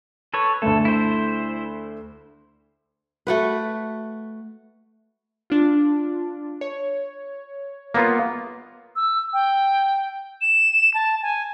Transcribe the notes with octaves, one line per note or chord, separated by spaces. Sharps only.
A4 B4 C#5
D2 A3 A4
E4 C5
A3 F#4 B4
D4 F4
C#5
A#3 B3 F4
E6
G5
E7
A5
G#5